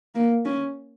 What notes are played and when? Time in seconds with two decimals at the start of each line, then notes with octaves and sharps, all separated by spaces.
0.15 A#3
0.46 C#4